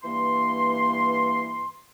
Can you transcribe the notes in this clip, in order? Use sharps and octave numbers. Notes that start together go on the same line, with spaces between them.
G2 E3 A#3 C6